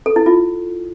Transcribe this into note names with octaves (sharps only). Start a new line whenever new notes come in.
A4
E4
F4